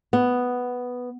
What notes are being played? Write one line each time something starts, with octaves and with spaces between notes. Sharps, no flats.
B3